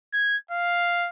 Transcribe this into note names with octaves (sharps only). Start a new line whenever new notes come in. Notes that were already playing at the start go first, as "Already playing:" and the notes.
G#6
F5